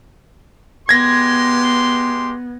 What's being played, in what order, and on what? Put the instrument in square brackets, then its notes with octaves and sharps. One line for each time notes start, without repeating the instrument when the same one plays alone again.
[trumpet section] G#3 G4 C6 [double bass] B3 [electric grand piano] G#6 A#6